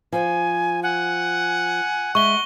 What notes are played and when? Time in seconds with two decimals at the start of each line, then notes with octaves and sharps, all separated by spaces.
0.13 F3 G#5
0.83 F#5 G#5
2.15 G#3 E5 C#6 G7